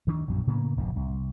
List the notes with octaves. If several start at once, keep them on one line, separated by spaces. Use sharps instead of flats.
D2 D#3 B3 D4
A#1 F#2 B2 F#3
A2 C#3 A#3 B3
F1 A#1 F2 G#2
C2